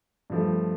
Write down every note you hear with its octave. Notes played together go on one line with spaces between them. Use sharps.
G2 F3 A3